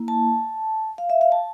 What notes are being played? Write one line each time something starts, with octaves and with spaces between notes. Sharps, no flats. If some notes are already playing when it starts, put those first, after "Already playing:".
Already playing: A#3 E4
A5
F5
E5
F5
A5